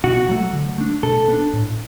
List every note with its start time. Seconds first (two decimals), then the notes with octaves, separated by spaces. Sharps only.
0.04 B2 F#4
0.29 F#3 A3
0.53 D3
0.78 A3 D4
1.03 B2 A4
1.28 B3
1.33 D4
1.53 A2